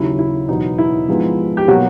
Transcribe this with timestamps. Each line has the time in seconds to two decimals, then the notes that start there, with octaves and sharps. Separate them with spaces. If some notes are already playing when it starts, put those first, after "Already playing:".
Already playing: D#2 C#3 F#3 E4
0.19 E4
0.49 E2 B2 F#3 B3 D#4
0.78 E4
1.08 G#2 F3 G#3 B3
1.57 G4
1.68 B2 F#3 A#3 F#4